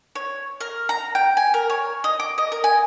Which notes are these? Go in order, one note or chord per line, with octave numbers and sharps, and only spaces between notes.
C#5
A#4
A#5
G5
G#5
A#4
C#5
D#5
D6
D#5
A#4
G#5